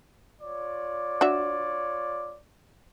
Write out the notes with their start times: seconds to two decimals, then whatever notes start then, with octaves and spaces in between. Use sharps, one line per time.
0.41 F4 C#5 D5
1.21 D4 F#4 E5